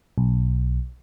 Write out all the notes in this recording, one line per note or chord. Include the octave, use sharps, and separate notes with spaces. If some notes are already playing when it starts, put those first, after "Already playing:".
B1